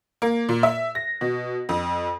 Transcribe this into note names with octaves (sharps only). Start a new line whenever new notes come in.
A#3
A#2
E5
A#6
B2
F2